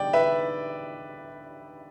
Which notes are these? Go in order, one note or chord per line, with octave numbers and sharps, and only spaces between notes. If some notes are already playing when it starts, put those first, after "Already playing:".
Already playing: D3 G3 D5 G5
B4 E5